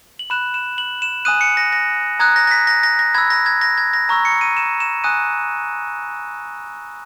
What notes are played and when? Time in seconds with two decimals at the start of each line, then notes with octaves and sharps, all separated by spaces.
0.19 F#7
0.30 B5 F#6 E7
0.54 E7
0.78 F#7
1.02 E7
1.25 G#5 D#6 F#6 D#7
1.41 C#7
1.57 A#6
1.73 A#6
2.20 A#5 D#6 F#6 G#6
2.36 A#6
2.47 A#6
2.51 B6
2.67 A#6
2.83 A#6
2.99 A#6
3.15 B5 E6 G#6
3.30 A#6
3.46 G#6
3.61 A#6
3.78 G#6
3.93 A#6
4.09 A#5 C#6 E6 A#6
4.25 C#7
4.41 D#7
4.57 E7
4.80 E7
5.04 G#5 D#6 F#6 D#7